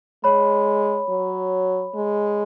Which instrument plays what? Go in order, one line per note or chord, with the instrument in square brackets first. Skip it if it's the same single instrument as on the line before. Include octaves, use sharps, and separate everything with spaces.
[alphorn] G#3 [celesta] C#5 B5
[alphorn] F#3
G#3